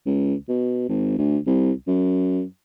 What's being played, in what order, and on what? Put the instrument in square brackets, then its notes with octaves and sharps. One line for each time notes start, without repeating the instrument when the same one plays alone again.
[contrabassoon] C#2
B2
G#1
D2
C2
F#2